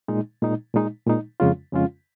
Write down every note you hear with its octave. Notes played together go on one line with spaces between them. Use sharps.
A#2 G#3 D#4
A#2 G#3 D#4
A#2 G#3 D#4
A#2 G#3 D#4
F2 C#3 G#3 C#4 F4
F2 C#3 G#3 C#4 F4